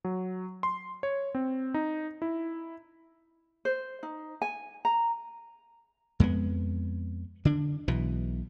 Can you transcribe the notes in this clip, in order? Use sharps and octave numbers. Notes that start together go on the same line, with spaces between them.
F#3
C6
C#5
C4
D#4
E4
C5
D#4
G#5
A#5
F2 G#3 A#3 B3
D3 D4
B1 B2 E3